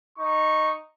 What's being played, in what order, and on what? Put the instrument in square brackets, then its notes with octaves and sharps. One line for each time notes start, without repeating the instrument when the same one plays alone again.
[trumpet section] D#4 C#6